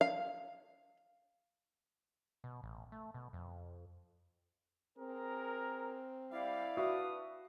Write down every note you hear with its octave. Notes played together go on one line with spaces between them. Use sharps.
F5
B2
A1
A3
B2
F2
C4 G#4 A#4
G3 E4 D5 F5
D4 F#4 B4 E5 D#6